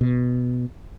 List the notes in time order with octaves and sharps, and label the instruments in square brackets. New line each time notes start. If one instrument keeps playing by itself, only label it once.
[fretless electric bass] B2